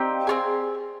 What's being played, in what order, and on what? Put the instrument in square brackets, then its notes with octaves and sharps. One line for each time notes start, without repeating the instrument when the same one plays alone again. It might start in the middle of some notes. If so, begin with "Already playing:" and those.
Already playing: [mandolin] C4 D#4 G4 D5 F5
C4 F4 G#4